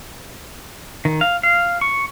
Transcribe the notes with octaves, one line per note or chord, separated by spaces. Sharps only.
D#3
F5
F5
C#6